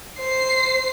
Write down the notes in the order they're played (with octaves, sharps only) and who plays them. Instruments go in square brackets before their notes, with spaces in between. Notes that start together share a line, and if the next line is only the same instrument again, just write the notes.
[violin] C5 C7